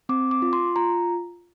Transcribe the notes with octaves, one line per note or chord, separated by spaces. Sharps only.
C4 D6
D6
F4
C6
F4 A#5